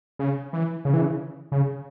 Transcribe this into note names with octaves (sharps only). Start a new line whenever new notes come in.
C#3
E3
C#3
E3
C#3
C#3